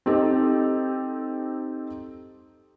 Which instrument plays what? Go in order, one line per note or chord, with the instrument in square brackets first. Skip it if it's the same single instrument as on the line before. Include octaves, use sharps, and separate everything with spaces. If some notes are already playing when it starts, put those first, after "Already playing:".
[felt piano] C4 D#4 G4 A4